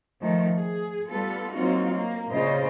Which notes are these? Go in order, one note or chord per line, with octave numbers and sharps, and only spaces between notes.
D#3 F3 A3
G#4
G3 B3 F4 A4
F#3 A#3 C4 D#4 F4 F#4
A#3
A#2 C#3 F4 C5 D#5